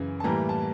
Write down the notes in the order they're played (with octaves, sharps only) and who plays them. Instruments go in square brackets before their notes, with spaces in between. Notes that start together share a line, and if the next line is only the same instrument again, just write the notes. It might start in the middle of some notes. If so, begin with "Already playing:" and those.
Already playing: [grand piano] F#2 C#3 E3
A5
A2 E3 G3 A#3 A#5
A5